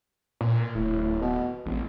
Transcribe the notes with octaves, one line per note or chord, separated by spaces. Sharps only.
A#2
D1 A2
B2
E1 A1